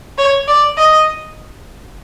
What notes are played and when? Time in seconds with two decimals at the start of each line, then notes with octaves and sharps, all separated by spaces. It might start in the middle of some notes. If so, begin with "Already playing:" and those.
0.18 C#5
0.48 D5
0.78 D#5